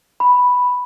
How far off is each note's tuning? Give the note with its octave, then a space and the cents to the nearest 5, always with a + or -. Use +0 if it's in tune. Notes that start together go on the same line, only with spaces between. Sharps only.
B5 +0